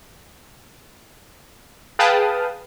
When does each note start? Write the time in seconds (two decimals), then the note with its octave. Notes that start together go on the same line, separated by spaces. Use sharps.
1.99 G#4 B4 F5 G5 A5 D#6